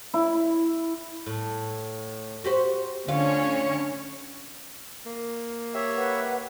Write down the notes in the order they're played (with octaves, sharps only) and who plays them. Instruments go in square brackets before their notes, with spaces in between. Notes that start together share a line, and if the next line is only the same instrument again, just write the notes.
[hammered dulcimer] E4
[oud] A2
F#4 G4 C5
[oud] D2 F4 F5 [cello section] D3 C#4 C#5
[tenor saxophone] A#3
[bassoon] G4 [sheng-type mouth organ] C#5 E5
[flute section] B4 F#5